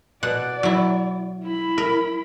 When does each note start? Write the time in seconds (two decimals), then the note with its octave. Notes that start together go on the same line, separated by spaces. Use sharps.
0.23 B2 D5 F#5
0.63 F#3 E4
1.43 E4 B5
1.78 A#4